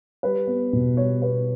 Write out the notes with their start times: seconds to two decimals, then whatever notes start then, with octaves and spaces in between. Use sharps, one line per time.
0.23 G3 B4
0.47 B3
0.73 B2
0.97 G3 C#5
1.22 B3 B4